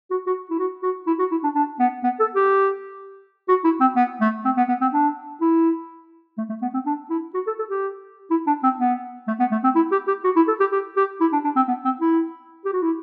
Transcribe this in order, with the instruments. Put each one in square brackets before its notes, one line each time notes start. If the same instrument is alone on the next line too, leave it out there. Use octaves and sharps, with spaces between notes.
[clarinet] F#4
F#4
E4
F#4
F#4
E4
F#4
E4
D4
D4
B3
B3
A4
G4
F#4
E4
C4
B3
A3
C4
B3
B3
C4
D4
E4
A3
A3
B3
C4
D4
E4
F#4
A4
A4
G4
E4
D4
C4
B3
A3
B3
A3
C4
E4
G4
G4
F#4
E4
A4
G4
G4
G4
E4
D4
D4
C4
B3
C4
E4
G4
F#4
E4